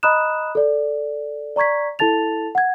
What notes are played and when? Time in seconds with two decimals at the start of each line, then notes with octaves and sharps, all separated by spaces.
0.03 D#5 A#5 B5 D#6 F#6 E7
0.55 A4 D5
1.56 D5 A#5 C#6 G#6 B6
1.99 E4 A4 A5 A6 F7
2.55 F#5 G#6